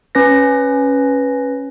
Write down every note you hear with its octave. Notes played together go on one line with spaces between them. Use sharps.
C#4 B4 A#6